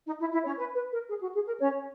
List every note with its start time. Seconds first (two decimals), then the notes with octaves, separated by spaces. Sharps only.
0.06 D#4
0.19 E4
0.32 E4
0.44 C#4 C#5
0.57 B4
0.74 B4
0.91 A#4
1.08 G#4
1.20 F#4
1.33 G#4
1.46 A#4
1.59 C#4 C#5